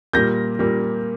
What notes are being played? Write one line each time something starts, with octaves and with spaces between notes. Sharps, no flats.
A#2 G3 A#3 G6 A#6
A#2 G3 A#3